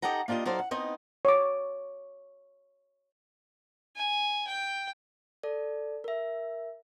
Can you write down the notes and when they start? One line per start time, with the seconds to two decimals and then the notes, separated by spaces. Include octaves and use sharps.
0.02 D#4 G4 A4 D#5 F#5 A#5
0.28 A#3 D4 F4 G4 D#5
0.45 F#3 D#4 A4 C5 D5 F5
0.59 F#5
0.71 B3 C4 D#4 D#5
1.25 C#5 D6
3.96 G#5
4.47 G5
5.43 A4 D5
6.04 A#4 E5